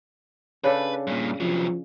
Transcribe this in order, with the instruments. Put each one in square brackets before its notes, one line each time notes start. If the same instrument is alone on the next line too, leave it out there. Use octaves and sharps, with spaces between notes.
[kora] C#3 D4 A4 [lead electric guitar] B4
[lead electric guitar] G2 A#2
[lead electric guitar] C3 F#3 [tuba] F3